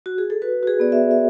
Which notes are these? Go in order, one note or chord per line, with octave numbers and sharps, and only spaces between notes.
F#4
G#4
A4
F#4 B4
F#4
G#4
B3 D5
E5
E5